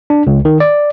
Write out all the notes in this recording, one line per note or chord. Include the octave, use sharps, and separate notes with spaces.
D4
C#2
D#3
D5